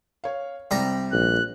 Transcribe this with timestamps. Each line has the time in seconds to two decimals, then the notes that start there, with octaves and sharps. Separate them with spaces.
0.24 C#5 F5
0.71 C2 G3 C4 A#5
1.12 A#1 F#6